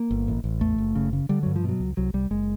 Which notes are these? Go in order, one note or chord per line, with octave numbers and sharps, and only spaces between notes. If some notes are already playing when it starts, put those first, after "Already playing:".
Already playing: A#3
G1
A1
A1
E2 A3
F#1
C#3
C#3
D3 G3
G2 F#3
F3
B2 F#3
C#2
C2 F#3
C2 G3
F#1 G#3